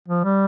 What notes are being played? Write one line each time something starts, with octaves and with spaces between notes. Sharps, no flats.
F3
G3